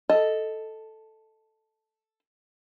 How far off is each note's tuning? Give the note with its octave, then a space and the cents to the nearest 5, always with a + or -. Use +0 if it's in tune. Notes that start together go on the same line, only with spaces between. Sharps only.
A4 +0 D#5 +10